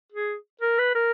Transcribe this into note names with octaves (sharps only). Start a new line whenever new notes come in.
G#4
A#4
B4
A#4